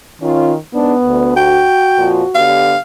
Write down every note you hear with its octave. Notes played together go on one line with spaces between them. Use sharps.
D#3 C#4 F4
G#2 B3 D4
D2
F#4 G5
F2 A#2 F3
D3 B3 G4 F5